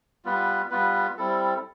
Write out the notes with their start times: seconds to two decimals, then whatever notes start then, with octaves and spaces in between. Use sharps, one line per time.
0.25 G3 B3 F4 B4
0.71 G3 B3 F4 B4
1.17 G3 C4 E4 A4